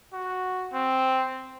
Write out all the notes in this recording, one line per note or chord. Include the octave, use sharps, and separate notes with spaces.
F#4
C4